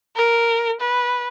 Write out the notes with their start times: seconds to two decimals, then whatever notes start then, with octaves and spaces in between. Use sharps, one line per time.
0.16 A#4
0.80 B4